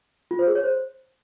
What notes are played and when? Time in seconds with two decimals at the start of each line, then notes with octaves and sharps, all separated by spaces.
0.31 F4
0.39 C5
0.47 G#4
0.55 C#5
0.64 C5